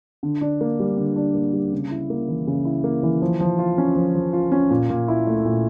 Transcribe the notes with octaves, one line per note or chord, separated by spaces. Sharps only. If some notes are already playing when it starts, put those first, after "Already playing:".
D3
D4
A#3
G3
D3
D4
A#3
G3
C#3
E4
A#3
E3
C#3
E4
A#3
E3
F3
F3
F4
C#4
F3
F3
F4
C#4
A#2
A#2
E4
A3
A#2